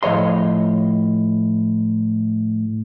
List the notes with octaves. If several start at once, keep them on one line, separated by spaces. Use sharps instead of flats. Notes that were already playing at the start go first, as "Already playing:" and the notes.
A2 F3 C#5 D#5 C6